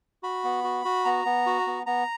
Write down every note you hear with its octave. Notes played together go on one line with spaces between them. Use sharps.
F#4 B5
B3
F#4
F#4
B3 A#5
B3
F#4
B3
B3 A#5